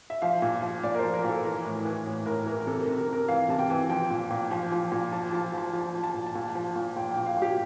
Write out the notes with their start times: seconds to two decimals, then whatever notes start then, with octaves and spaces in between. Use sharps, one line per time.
0.10 E5
0.22 F3 F5
0.42 A#2
0.62 F3
0.83 A#2 D5
0.95 A#4
0.98 F3 C5
1.14 A#4
1.24 A#2 A4
1.44 E3 A#4
1.65 A2
1.85 E3
2.06 A2
2.26 A2 A#4
2.46 E3 A#4
2.60 A#4
2.67 C3 A4
2.82 A#4
2.87 C3
2.98 A#4
3.08 C3
3.13 A#4
3.28 E3 F5
3.49 C3 A5
3.59 G5
3.70 E3
3.90 F3 G5
4.10 A#2
4.31 A#2
4.51 F3
4.71 F3
4.92 A#2
5.12 F3 A5
5.33 F3 A5
5.54 F3 A5
5.73 F3
5.81 A5
5.94 F3
6.04 A5
6.15 A#2
6.26 A5
6.35 A#2
6.50 F3 A5
6.76 A#2
6.96 A#2 G5
7.11 G5
7.16 A#2
7.26 F5
7.37 A#2 G4